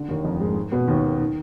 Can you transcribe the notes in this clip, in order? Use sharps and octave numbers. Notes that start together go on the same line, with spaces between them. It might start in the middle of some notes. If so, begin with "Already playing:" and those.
Already playing: D3
D#2 D#3
F2 F3
G#2 G#3
B2 B3
D#2 D#3
D#3